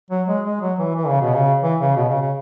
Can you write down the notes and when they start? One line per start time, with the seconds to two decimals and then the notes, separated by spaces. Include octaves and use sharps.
0.10 F#3
0.28 G#3
0.45 G#3
0.61 F#3
0.79 E3
0.96 E3
1.08 C#3
1.22 B2
1.34 C#3
1.63 E3
1.80 C#3
1.96 B2
2.09 C#3
2.21 C#3